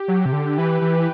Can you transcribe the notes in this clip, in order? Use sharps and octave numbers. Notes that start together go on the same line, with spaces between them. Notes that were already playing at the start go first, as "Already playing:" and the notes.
Already playing: G4
F#3
C3
D3
E3 B4
E3